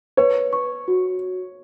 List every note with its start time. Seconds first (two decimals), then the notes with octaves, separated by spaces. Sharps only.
0.17 B4 C#5
0.53 C#6
0.88 F#4